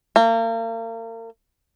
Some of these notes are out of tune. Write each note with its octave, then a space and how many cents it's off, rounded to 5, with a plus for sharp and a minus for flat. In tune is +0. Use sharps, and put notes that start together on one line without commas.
A#3 -40